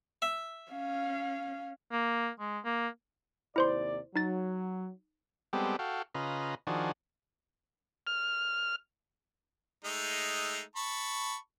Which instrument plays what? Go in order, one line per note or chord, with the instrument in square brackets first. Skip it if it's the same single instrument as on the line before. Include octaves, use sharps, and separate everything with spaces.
[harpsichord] E5
[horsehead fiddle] C#4 F5
[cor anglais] A#3
G#3
A#3
[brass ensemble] D#2 C3 D5 [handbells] E4 C5 C6
[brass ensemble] F#3 [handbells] D#4 A6
[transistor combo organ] G3 G#3 B3 C4 G4 A4
F#4 A4 F5 G5
C#3 F4 B4 D#5 A#5
D#3 F3 D4 F#4 G#4
F6
[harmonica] G#3 A3 D#4
A5 B5 C#6